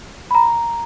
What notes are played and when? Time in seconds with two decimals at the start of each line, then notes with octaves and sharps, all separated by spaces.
0.31 B5
0.35 A#5